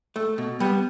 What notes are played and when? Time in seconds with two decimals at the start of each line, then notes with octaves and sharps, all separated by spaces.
0.16 A3
0.38 B2
0.60 G3 B3